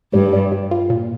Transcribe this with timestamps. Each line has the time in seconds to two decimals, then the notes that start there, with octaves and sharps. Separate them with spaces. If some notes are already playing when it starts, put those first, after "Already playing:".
0.13 G2 G3
0.33 G3
0.52 G3
0.71 F4
0.90 A#2